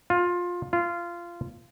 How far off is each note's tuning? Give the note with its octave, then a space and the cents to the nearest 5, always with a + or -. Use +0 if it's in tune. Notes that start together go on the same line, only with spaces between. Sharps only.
F4 +15
F4 -20